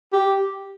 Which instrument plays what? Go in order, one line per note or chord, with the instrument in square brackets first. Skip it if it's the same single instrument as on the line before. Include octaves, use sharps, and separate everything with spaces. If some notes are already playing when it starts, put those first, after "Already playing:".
[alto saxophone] G4